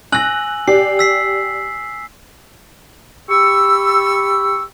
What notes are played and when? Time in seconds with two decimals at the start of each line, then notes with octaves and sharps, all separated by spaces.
0.12 G#5 E6 F#6 A#6 F#7
0.68 G4 D5 C7
0.99 E6 B6 C7
3.29 G4 B5 C#6 E6